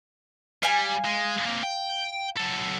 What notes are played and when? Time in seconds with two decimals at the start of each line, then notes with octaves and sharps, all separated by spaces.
0.63 G3 F5 G#5
1.05 G#3
1.46 A#3 C4
1.63 G5
2.37 F#3 A4